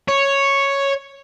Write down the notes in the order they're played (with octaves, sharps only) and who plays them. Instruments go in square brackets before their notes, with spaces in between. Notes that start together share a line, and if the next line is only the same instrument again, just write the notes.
[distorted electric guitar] C#5